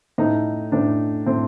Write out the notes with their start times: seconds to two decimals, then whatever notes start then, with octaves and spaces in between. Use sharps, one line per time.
0.18 A2 D#4
0.72 A2 D4
1.26 A2 C4